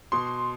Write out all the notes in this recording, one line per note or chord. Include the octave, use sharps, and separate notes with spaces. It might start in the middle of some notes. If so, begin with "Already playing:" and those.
B2 C6